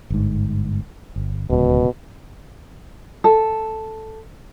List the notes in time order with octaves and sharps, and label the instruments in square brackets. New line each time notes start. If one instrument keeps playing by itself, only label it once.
[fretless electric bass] G1 G#2
G1
[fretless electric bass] D1 C#2 [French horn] B2
[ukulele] A4